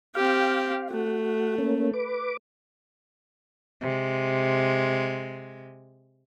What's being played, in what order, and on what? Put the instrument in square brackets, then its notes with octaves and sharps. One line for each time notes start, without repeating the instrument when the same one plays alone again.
[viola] C4 G4 [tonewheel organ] F5
[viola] A3 [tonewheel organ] F#4
[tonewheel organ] A#3 C#4
B4 D6
[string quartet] C3 G#3